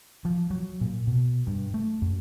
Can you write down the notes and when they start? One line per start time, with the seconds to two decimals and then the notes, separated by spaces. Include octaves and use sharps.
0.25 F3
0.51 F#3
0.81 A#2
1.07 B2
1.47 G2
1.74 A3
2.02 F#2